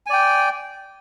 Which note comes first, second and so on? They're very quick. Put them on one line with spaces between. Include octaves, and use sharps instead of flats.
G#5 D5 G5